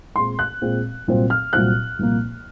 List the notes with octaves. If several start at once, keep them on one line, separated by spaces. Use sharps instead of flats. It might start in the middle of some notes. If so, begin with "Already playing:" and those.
A#2 G#3 C4 C6
F#6
A#2 G#3 C4
C2 A#2 F#3 C4
F6
C2 A#2 F#3 C4 F#6
C2 A#2 F3 A#3